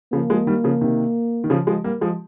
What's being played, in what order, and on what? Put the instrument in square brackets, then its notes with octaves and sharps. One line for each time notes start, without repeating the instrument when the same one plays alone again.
[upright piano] C#3 F3 [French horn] A#3
[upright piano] F3 G#3
D#3 G3
C#3 F3
C3 D#3
D#3
C#3 F3
F3 G#3
G3 A#3
F3 G#3